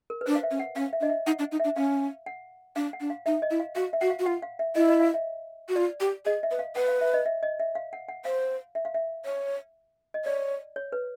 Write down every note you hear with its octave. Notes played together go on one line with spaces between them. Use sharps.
A#4
B4
D4 C5
F5
E5
C#4
F#5
C#4 F5
E5
D4 D#5
E5
D#4 F#5
D4
D#4
D4 E5
C#4 F5
F#5
D4 F5
F#5
D4
F5
D#4 E5
D#5
E4
F5
F#4 F5
E5
F#4 F#5
F5
F#4
F4 F#5
F5
E5
E4 D#5
D#5
F5
E5
F#4
F4 D5
G4
G#4 D#5
E5
B4
F5
B4 F#5
F5
E5
D#5
E5
D#5
E5
F5
F#5
F#5
C5 F5
E5
F5
E5
C#5
D#5
C#5 D5
C#5
B4